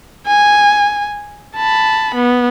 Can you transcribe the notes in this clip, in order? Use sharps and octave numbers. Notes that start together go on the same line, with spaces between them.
G#5
A5 B5
B3